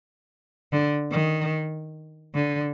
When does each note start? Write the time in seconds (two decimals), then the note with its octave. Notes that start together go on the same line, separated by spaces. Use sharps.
0.73 D3
1.12 D#3
2.35 D3